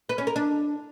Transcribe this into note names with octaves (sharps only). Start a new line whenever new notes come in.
B4
C#4
A#4
D4